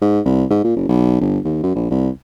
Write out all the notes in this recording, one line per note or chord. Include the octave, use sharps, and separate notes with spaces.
G#2
C2
G#2
A#2
F#1
B1
G1
D#2
F#2
A#1
C2